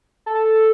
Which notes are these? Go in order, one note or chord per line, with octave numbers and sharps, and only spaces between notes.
A4